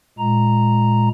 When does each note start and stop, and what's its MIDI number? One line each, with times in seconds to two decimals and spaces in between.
0.19 1.09 46
0.19 1.09 56
0.19 1.09 82